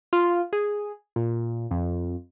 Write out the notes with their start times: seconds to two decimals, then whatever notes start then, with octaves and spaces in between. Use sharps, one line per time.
0.13 F4
0.53 G#4
1.16 A#2
1.71 F2